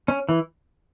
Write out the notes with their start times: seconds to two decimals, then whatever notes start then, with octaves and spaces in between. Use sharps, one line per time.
0.08 C#4
0.29 E3